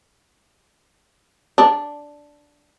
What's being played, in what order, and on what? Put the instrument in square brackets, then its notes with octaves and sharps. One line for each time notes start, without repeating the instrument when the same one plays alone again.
[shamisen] D4